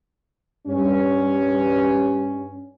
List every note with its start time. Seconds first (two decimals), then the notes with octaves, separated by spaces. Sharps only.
0.67 G2 C#4